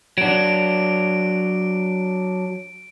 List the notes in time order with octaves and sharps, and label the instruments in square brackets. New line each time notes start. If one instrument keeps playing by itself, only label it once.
[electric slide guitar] F#3 D4 [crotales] D7